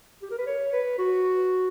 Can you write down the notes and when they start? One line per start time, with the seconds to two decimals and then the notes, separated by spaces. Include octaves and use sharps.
0.22 G4
0.31 A#4
0.39 B4
0.47 C#5
0.73 B4
0.99 F#4